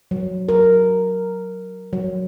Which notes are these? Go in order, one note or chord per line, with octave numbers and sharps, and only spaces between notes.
F#3
A#4
F#3